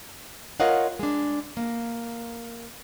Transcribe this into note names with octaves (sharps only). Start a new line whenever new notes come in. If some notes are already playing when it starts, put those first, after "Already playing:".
F4 A#4 C#5 D#5 F5 F#5
G#3 D4
A#3